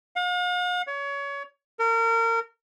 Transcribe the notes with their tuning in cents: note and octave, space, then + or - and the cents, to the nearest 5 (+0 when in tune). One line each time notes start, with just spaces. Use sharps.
F5 +45
C#5 +25
A#4 -30